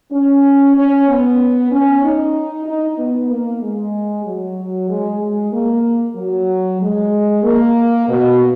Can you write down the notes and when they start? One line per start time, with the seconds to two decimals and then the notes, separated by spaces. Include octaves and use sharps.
0.12 C#4
0.76 C#4
1.08 B3
1.71 C#4
2.03 D#4
2.66 D#4
2.98 B3
3.30 A#3
3.62 G#3
4.25 F#3
4.89 G#3
5.21 G#3
5.52 A#3
6.16 F#3
6.80 G#3
7.43 A#3
8.07 B2